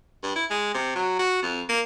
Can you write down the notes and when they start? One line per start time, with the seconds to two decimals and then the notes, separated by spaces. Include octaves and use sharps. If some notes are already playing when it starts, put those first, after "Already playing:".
0.23 G2
0.36 E4
0.50 G#3
0.74 C3
0.95 F#3
1.19 F#4
1.43 F2
1.69 A#3